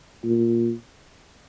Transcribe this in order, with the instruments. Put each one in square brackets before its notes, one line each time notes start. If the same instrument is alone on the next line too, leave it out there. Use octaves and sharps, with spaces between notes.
[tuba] A#2